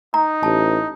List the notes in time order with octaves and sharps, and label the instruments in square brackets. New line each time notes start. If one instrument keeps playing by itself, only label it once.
[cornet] D#4 [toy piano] A#5
[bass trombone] A1 [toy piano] A5